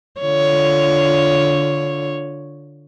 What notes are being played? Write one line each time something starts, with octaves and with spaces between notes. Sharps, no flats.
D3 F4 C#5